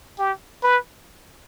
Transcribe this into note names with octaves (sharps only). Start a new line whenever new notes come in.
G4
B4